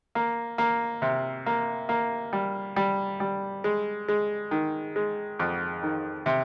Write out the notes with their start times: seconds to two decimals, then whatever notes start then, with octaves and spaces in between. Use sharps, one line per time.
0.15 A#3
0.58 A#3
1.02 C3
1.46 A#3
1.89 A#3
2.33 G3
2.76 G3
3.20 G3
3.64 G#3
4.08 G#3
4.51 D#3
4.96 G#3
5.39 F2
5.83 D#3
6.26 C3